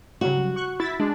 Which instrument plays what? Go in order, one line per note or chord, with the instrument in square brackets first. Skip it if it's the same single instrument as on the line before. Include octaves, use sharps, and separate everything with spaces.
[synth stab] C#3 F#3 G3 [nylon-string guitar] F#4
[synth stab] C#6 F#6
[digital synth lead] E4 [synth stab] A6 B6
[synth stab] G#3 [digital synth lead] D4